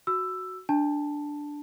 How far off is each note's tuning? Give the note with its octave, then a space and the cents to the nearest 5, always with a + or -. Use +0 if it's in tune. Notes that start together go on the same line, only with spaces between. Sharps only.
F#4 +0 E6 +10
D4 +0 A5 +0